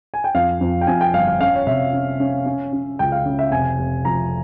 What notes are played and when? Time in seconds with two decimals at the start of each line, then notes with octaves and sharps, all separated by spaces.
0.14 G#5
0.24 G5
0.34 F2 F5
0.61 F2
0.81 G5
0.87 F2 G#5
1.01 G5
1.13 G1 F5
1.27 F5
1.40 C#4 F5
1.55 C#5
1.67 C3 E5
1.93 C#4
2.20 C#4
2.46 C#4
2.73 C#4
2.99 C#2 G5
3.12 F5
3.26 C#3
3.39 E5
3.51 F1 G#5
3.79 F1
4.05 F2 A#5